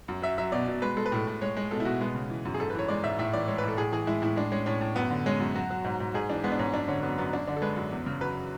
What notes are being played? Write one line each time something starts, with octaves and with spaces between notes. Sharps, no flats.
F#2
F#3 E5
F#3 E5
B2 D5
B2
G#3 B4
G#3 A4
B4
A2 A4
A2
G#3 C#5
G#3
B2 A4
E4
B2 F#4
G#3 B3
C#3
E3
F#2
G#4
G#2 A4
B4
E3 C#5
G#3 D5
G#2 E5
A2 E5
E3 D5
G#3 C#5
B4
A2 A4
A2 G#4
E3 G#4
G#3 E4
A2 E4
G#3 D4
G#3 C#4
A2 C#4
A2
F#2 B3
D3
G#3 C#4
F#2
F#3 F#4
F#3
G#2
G#2
G#2 G#4
E3 D4
G#3 B3
D4
G#2 C#4
F#2 D4
D3 C#4
F#3 B3
F#2 B3
F#2 D4
D3 D4
A4
G#3 B4
F#2
E2
C#3
F#3 B4